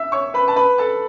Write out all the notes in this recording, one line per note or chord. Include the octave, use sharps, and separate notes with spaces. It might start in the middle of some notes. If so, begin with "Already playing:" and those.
Already playing: E5 E6
C#5 C#6
B4 B5
A5
B4 B5
A4 A5